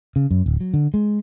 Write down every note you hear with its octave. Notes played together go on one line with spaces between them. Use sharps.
C#3
F#2
D1
F#3
D3
G#3